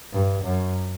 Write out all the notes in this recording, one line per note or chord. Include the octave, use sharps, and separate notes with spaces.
G2
F#2